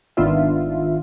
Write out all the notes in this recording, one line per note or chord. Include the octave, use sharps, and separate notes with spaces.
G#1 D#3 B3 D4 F4 E5